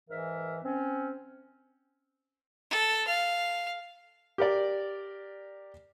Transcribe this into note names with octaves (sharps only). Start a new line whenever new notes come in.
G#2 E3 A#4 E5
C4 C#4
A4
F5
G4 A#4 D5